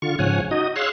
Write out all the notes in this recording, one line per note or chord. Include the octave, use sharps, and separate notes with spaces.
D3 F4 C#6
G#2 C#3 F3 C#5 F#5 G#5
D#4 F#4 D#5 D#6
G#4 C#5 F5 C6 E6 F#6